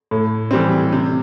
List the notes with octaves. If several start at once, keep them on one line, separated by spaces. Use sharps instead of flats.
A2
E3 G3 C4
C3